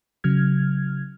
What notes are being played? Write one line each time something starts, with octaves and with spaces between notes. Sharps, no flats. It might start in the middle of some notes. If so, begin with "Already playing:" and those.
C#3 F#3 F6 G#6